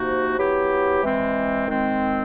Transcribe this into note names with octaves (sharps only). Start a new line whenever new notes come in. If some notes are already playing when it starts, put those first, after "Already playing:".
Already playing: C3 F3 A#3 D#4 F#4
F#3 B3 E4 G4
E3 G#3 C4
D#3 G#3 C4